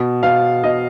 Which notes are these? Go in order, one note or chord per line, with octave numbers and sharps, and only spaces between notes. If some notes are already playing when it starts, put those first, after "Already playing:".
Already playing: B2
B2 F5
B2 D#5